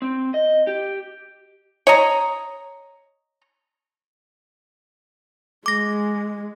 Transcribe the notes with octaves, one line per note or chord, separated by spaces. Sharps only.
C4
D#5
G4
C#5 D#5 A#5
G#3 D6 A#6